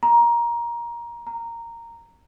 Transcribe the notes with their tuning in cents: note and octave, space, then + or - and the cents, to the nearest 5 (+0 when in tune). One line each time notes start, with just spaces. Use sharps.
A#5 +15
A#5 -10